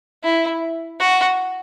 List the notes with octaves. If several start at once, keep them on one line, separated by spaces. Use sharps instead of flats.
E4
F#4